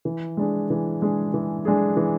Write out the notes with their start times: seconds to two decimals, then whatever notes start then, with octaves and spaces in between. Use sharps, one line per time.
0.05 E3
0.37 G#3 D4 G#4
0.70 E3
1.02 G#3 D4 G#4
1.34 E3
1.65 G#3 D4 G#4
1.96 E3